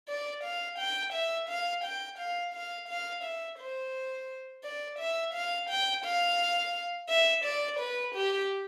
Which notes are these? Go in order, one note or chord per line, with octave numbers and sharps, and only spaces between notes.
D5
F5
G5
E5
F5
G5
F5
F5
F5
E5
C5
D5
E5
F5
G5
F5
E5
D5
B4
G4